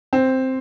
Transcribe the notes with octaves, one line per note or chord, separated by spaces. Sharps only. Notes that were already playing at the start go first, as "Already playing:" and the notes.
C4